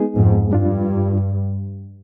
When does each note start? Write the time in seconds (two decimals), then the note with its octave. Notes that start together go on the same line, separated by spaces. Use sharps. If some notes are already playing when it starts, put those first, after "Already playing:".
Already playing: G#3 B3 D#4 G#4
0.16 F2 G#2
0.50 G2 G3 D4 F4